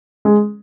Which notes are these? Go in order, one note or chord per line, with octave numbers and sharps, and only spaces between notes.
G#3